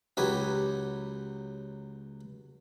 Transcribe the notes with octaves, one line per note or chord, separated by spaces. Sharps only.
C#2 F#3 G4 B4 G#5